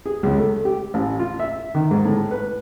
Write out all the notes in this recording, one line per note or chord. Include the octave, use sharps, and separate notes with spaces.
G#4
C#2
A3
G4
A1
F4
E5
D#3
G#2
A2
B4